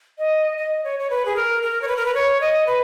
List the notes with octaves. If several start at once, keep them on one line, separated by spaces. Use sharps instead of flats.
D#5
D#5
C#5
C#5
B4
G#4
A#4
A#4
C#5
B4
A#4
B4
C#5
D#5
B4